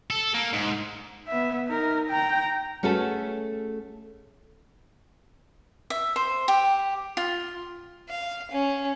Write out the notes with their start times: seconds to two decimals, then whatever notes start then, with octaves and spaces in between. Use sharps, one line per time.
0.11 A4
0.34 A#3
0.54 G#2
1.28 B3 E5
1.68 D#4 A#4
2.10 G5 A#5
2.83 A3 C#4 F#4 G#4 A4
5.90 E5
6.16 C5
6.48 G4
7.17 F4
8.09 F5
8.51 C#4